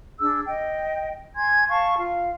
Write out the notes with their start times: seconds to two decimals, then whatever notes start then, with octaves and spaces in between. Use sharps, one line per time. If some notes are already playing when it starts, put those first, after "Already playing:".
0.20 D4 G#4 E6
0.47 D#5 G5
1.34 G#5 C6 G#6
1.69 F5 A5 C#6
1.97 F4 F5